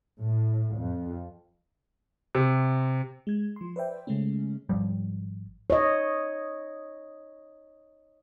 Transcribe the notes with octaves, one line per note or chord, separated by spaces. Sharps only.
A2
F2
C3
G#3 G#6
F3 C6
B4 C5 D5 E5 G5
C#3 G#3 A3 C#4
G#1 F3 G3
C#5 D#5